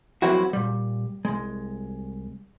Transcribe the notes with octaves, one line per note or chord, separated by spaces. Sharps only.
F3 F#3 A#3 C4 E4 F#4
A#2 G3
C2 G#3